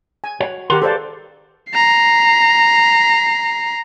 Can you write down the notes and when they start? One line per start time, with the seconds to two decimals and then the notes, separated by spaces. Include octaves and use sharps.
0.24 G#5
0.40 F#4 C#5
0.70 D#3 G4 A#4 F#5 C6
0.82 G#4 A4 B4 C5 D5 F5
1.71 A#5 C7